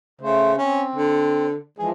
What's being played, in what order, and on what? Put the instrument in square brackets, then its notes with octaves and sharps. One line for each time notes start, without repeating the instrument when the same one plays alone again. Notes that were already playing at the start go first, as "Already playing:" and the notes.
[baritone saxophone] C#3 [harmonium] A3 C5
[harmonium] C4 [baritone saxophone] C#4
[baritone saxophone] D3
[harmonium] E3 F3 G#3 [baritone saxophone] G#4